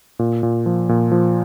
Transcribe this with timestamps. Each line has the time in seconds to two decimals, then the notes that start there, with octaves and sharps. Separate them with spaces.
0.19 A#2
0.43 A#2
0.66 F3
0.89 A#2
1.11 F3